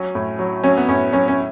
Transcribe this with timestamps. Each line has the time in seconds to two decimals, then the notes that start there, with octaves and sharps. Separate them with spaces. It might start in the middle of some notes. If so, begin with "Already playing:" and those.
Already playing: F#3 C#4
0.15 A2
0.39 F#3
0.64 F#3 C#4
0.77 B3
0.88 A2 C#4
1.13 F#3 C#4
1.28 C#4